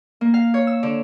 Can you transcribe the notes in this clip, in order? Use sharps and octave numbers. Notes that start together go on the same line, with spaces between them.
A#3
F5
C#5
E6
D3